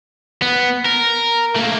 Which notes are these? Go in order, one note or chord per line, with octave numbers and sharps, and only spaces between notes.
B3
A#4
A3 A#3